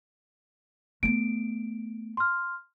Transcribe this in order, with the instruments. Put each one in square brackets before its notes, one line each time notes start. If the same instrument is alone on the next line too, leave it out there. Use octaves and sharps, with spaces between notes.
[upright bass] A3 B3 [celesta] D7
[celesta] C6 F6